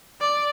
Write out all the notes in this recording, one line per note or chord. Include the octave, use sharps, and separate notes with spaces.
D5